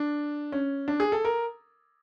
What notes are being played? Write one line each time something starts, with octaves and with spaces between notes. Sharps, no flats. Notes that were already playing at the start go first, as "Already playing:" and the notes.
Already playing: D4
C#4
D4
G#4
A4
A#4